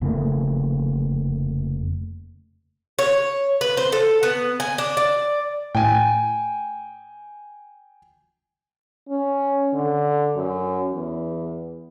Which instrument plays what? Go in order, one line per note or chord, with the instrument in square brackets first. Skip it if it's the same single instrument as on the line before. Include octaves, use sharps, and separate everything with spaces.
[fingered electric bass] F1 C#3 A3 A#3
[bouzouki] C#5
B4
C5
A4
B3
G#5
D4
D5
[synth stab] A2 [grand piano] G5 G#5
[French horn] C#4
D3
F#2
E2